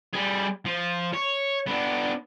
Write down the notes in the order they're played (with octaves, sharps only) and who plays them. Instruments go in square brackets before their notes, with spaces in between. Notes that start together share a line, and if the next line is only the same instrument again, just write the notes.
[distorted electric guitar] G3 G#4
F3
C#5
B3 D4